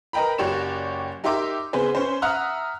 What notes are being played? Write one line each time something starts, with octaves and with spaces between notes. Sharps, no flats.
A#4 B4 D#5 G5 A#5 B5
F#1 F#4 G4 C#5 D5 E7
D#4 G4 A#4 E5 C6 D6
C#3 B3 G#4 B4 C5
C#4 B4 C5
E5 F#5 A#5 D#6 F6 F#6